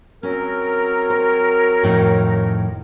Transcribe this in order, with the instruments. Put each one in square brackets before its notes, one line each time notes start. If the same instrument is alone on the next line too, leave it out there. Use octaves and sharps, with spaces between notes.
[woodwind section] F#3 C4 A#4 [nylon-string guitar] C#4
[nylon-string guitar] C5
F2 A2 D#3